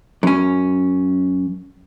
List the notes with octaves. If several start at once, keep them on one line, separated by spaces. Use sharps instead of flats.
F#2 C#4